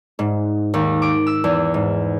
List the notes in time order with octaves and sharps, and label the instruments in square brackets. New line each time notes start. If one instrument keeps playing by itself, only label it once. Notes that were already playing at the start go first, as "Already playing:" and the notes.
[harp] G#2
D#2
D6
E6
E2
G#2